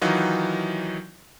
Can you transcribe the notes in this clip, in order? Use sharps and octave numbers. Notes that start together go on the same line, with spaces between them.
D#3 E3 F#3 D#4 F4